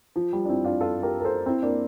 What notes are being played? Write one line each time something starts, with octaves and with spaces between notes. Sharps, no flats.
F3
G3
D4
C4 E4
D4 F4
F4 A4
G4 A#4
A#4
A4 C5
C4 E4
A#3 D4